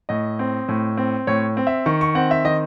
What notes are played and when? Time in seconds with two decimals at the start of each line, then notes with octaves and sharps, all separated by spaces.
0.09 A2 D#5
0.39 C4
0.69 A2
0.97 C4
1.27 A2 C#5
1.57 C4
1.67 E5
1.86 D#3 C#6
2.01 C#6
2.15 C4 F#5
2.31 E5
2.45 D#3 D#5